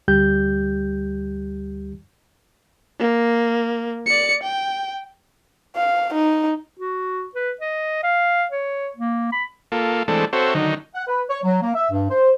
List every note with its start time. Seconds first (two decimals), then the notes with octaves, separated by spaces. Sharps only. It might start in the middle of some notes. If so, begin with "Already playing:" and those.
0.08 D2 G3 G4 G6
2.99 A#3
4.06 D5 C#7
4.43 G5
5.77 F5
6.14 D#4
6.79 F#4
7.35 B4
7.61 D#5
8.03 F5
8.51 C#5
8.96 A#3
9.32 B5
9.72 A#3 F4 A4
10.08 E3 G#3 A3 C4 D4 A4
10.33 C4 F#4 A4 C5 C#5 E5
10.55 D3 D#3 F#3 D#4
10.95 F#5
11.07 B4
11.29 C#5
11.43 F#3
11.62 A#3
11.75 E5
11.91 G2
12.09 C5